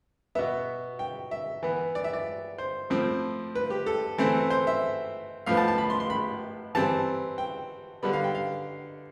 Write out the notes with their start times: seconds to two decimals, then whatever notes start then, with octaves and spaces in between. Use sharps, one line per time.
0.35 B2 B3 E5
0.99 G5
1.31 E5
1.63 E3 B3
1.95 D5
2.04 E5
2.13 D5
2.58 C5
2.90 A2 F3 C4
3.55 B4
3.70 G4
3.86 A4
4.18 E3 A3 C4
4.50 C5
4.67 E5
5.46 A2 F3 B3 F5
5.57 A5
5.68 A5
5.78 B5
5.90 C6
6.00 C6
6.10 B5
6.75 E3 G3 C4 A5
7.38 G5
8.03 D3 G3 B3 B5
8.13 F5
8.24 G5
8.35 F5